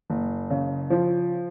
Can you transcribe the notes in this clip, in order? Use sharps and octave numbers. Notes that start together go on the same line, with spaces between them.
F#1
C#3
F3